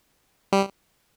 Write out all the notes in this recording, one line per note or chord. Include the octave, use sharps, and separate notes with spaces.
G3